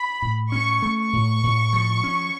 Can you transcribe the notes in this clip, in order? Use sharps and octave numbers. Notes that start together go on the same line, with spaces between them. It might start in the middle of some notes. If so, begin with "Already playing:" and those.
Already playing: B5
A2
C#4 C#6
A3
C#6
A2
A2
F3
C#4